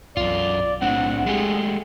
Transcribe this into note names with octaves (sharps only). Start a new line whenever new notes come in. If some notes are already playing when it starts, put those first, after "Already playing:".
B1 F#2 F4 D5
A2 C4 D4 F#5
G#3 A3 G4 G#4